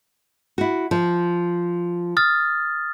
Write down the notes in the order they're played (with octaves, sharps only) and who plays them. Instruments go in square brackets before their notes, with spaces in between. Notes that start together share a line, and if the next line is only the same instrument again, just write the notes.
[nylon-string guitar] E4 F#4
F3
[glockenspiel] D#6 F6 A6